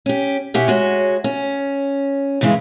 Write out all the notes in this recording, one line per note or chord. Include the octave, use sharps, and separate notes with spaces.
C#4 G4
B2 C#4 G4 E5 F#5
G#3 F#4 C#5
C#4
G2 C#3 E3 G#3